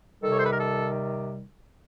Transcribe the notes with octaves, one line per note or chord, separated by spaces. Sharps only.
C3 D#3 G3 A4
C#5
C5
B4
A#4
A4